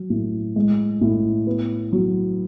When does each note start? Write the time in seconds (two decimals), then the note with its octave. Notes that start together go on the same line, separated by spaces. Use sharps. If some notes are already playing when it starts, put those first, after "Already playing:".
Already playing: F#3
0.10 A2
0.56 G#3
1.01 A2
1.47 B3
1.93 F#3